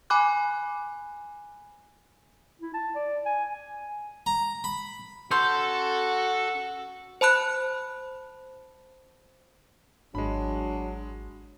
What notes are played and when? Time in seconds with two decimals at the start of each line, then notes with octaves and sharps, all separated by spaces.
0.10 G#5 B5 D6 F#6
2.62 E4
2.74 A5
2.95 D5
3.26 G#5
3.54 G#5
4.26 A#5
4.64 B5
5.31 C#4 F#4 A4 C6 G6
7.21 C5 A5 B5 F#6
10.15 G#1 F#3 G#3 D4 B5